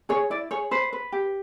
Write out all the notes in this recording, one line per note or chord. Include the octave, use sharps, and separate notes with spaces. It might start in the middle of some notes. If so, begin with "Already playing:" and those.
G#4 C#5
E4 D5
G#4 C#5
B4 C5
B4
G4